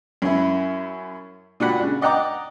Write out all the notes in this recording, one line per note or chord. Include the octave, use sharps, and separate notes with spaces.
F#2 C#4 E4
A#2 D4 F#4 G4 F#5 B5
C#3 D4
D5 D#5 F#5 G5 A#5 D6